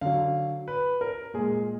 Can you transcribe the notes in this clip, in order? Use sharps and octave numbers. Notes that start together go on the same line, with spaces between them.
D3 F#3 F5
B4
A#4
A#2 G#3 G#4